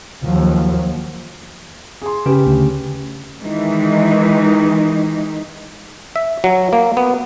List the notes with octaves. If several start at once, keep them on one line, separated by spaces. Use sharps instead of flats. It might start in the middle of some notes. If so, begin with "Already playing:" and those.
D#2 F3 F#3
G#4 C6
C#3 C#4 G4 B4
D2
D#3 E3 G#3 D#4
E5
F#3
A#3
B3